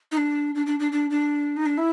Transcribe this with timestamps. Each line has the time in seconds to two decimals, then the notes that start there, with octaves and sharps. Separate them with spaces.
0.12 D#4
0.17 D4
0.55 D4
0.66 D4
0.80 D4
0.92 D4
1.10 D4
1.57 D#4
1.66 D4
1.78 E4